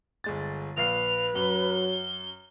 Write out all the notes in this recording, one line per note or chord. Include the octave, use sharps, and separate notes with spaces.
G1 G#3 A6
A#1 B4 F5 C7 F7
F#2 F#3 G7